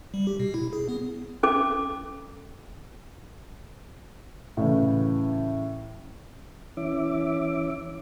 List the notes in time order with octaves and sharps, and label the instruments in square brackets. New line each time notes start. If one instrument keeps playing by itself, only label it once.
[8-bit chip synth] G3
G4
B2
E4
G#4
B3
[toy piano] C#4 A4 D6
[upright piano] A2 C#3 E3
[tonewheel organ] E3 C#4 E5 D6